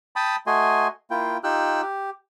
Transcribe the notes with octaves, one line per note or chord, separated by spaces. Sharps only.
G5 A5 B5 D#6
A3 F#4 D#5 G#5 C6
A#3 E4 F4 G5
D#4 F4 G4 G5 E6 F#6
G4